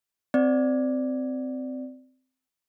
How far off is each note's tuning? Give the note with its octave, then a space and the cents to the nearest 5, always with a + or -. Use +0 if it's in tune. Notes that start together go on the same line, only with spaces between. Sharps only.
C4 -15 D5 +0